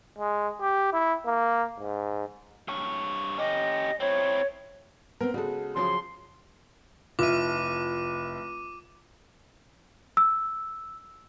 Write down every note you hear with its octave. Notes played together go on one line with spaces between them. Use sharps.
G#3
G4
E4
A#3
G#2
G2 C#5
C#4 G4 D#5
C4 E4 C#5
B3 C4 A#4
C#3 G#3 F#4 A4
C#3 F3 F#3 C6
F1 E4 F4 D6 D#7
E6